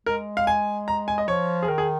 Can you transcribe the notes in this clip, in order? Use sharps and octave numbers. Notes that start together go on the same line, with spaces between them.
G#3 A#4
F5
G#5
A#5
G#5
D#5
F3 C#5
G#4
D#3 A#4
G#4